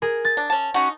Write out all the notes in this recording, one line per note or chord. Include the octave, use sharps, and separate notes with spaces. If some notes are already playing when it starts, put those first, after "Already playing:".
G#4 A#4
A6
D4
C#4 A5
C#4 D#4 F#4